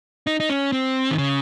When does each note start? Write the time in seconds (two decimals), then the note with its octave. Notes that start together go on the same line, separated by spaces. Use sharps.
0.27 D#4
0.40 D#4
0.49 C#4
0.72 C4
1.11 D#3
1.18 C#3